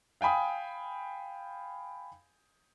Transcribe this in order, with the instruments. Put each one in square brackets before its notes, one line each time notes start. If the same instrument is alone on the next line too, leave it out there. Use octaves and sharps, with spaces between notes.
[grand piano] F5 G5 G#5 B5 D#6